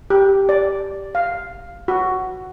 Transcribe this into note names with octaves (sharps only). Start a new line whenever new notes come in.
G4
D5
F5
F#4